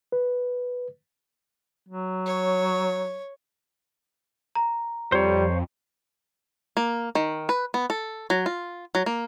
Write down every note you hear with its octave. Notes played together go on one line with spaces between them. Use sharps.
B4
F#3
C#5
A#5
F2 G3 C5 C#5
A#3
D#3
B4
B3
A4
F#3
F4
F#3
A#3